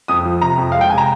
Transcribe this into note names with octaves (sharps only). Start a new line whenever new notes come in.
F2 D#6
F3
C3 A#5
F2
G#3 F5
G5
C3 G#5
A#5